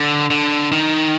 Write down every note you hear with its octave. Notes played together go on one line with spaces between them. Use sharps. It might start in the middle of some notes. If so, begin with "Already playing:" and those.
Already playing: D3
D3
D#3